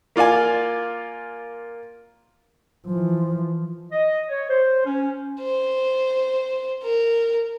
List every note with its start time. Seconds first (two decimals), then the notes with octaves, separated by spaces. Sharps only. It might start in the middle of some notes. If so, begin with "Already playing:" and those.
0.16 A#3 F4 D5 F5 G#5
2.86 E3 F3
3.91 D#5
4.28 C#5
4.50 C5
4.85 C#4
5.40 C5
6.83 A#4